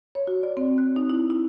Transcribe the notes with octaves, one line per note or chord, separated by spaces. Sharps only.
C#5
F#4
D5
C4
F#6
D#4
E4
E4